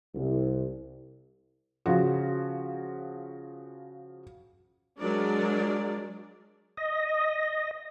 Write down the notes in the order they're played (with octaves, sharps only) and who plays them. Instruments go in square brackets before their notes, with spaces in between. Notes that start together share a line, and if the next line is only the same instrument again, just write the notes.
[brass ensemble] C2
[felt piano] C#3 F3 F#4
[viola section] F#3 G#3 D4 G#4 A#4 D5
[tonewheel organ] D#5